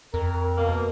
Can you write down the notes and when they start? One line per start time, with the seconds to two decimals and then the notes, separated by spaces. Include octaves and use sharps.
0.14 F2 A#4
0.58 B2 A#3